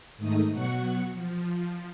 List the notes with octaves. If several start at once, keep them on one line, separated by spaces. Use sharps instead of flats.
G#2 D#3 A3 D#4 D#6
B2 F#3 F#5 C#6
F3